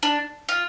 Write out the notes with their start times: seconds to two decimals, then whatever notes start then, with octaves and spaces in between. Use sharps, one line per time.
0.03 D4
0.49 F4